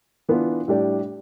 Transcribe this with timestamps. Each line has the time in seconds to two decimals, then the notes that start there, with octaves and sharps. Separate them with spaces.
0.29 E3 B3 D4 F4
0.68 A2 G3 D4 G4 D5